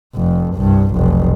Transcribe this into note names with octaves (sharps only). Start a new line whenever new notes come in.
F1 F2
C2 G2
F1 B1